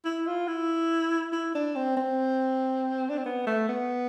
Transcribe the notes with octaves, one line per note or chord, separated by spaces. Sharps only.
E4
F4
E4
E4
D4
C4
C4
D4
C4
B3
A3
B3